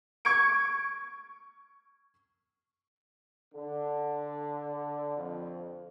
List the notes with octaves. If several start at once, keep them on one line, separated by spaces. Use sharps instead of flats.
C#6 G#6 C#7 D7
D3
F2